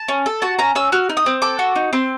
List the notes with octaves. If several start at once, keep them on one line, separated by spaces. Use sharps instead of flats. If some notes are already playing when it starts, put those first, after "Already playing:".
Already playing: A5
C#4
A4
F#4 A5
C#4 A#5
C#4 E6
F#4 F6
D#4
D#6
C4
A4 D6
F#4
D#4
C4 C6